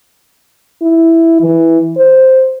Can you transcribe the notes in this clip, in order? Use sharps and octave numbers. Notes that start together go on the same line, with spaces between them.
E4
E3
C5